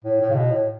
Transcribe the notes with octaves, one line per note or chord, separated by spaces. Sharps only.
A2
A2
C#3
B2
A2